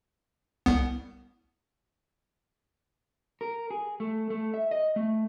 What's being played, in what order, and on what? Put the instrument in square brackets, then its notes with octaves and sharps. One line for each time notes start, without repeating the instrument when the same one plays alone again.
[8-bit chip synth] C2 B3
[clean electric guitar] A#4
G#4
A3
A3
E5
D#5
A3